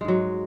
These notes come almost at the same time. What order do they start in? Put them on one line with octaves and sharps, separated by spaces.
G#3 G#2 F#3